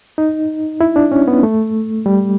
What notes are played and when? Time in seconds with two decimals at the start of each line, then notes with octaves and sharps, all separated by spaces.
0.18 D#4
0.81 E4
0.96 D4
1.12 C#4
1.28 B3
1.43 A3
2.06 G3